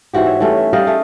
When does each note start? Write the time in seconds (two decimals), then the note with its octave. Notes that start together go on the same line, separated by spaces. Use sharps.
0.14 G#2 E3 F#4 G4
0.26 C#5 E5
0.40 E3 G3 A3 C#4
0.57 E5
0.73 G3 A#3 D#5 F5
0.87 A3 G#4